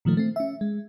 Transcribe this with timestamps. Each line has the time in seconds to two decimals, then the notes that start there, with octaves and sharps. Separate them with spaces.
0.05 A#2 D#3 F3 A3
0.17 A3 C4
0.36 C#4 E5
0.61 G#3